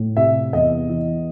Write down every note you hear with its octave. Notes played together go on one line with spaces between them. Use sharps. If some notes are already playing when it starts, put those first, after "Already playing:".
Already playing: A2
C3 E5
E2 D#5
E3